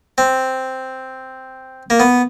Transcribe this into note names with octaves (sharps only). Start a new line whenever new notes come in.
C4
A#3
B3